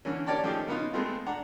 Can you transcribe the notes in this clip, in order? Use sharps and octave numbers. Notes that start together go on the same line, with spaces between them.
D3 E3 A#3 C#4
G4 A#4 C#5 D5 G5 A5
F3 A3 C#4 D#4 G4 G#4
C#3 A#3 B3 D#4 F4
G#3 A3 B3 C4 F4
D4 F#5 A#5